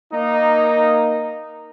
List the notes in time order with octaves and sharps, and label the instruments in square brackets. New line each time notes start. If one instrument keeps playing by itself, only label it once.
[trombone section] A#3 D#4